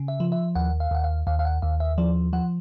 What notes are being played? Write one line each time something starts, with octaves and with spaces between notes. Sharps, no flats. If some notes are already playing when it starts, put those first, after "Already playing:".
Already playing: C#3
E5
F3
E5
D#2 F#5
F5
D#2 F#5
F5
D#2 F5
F5
F#5
D#2 F5
E5
F3 D5
F3 F#5